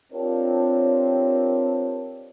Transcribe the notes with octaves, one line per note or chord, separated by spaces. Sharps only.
C4 D4 F4 G4 A#4 C#5